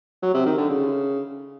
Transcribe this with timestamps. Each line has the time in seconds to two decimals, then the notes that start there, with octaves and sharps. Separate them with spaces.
0.22 F#3
0.34 C3
0.46 D#3
0.57 D3
0.69 C#3